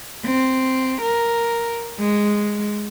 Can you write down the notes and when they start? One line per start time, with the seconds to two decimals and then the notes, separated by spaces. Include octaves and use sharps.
0.25 C4
1.02 A#4
1.99 G#3